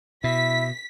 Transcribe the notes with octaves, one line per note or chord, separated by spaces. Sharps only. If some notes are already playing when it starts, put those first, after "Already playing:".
B2 E4 B6